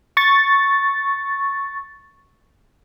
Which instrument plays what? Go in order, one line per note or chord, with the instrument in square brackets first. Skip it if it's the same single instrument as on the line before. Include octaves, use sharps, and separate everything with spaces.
[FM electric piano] C#6 A6